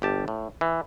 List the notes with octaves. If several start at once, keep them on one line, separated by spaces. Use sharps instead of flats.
G1 G4 A5
A2
E3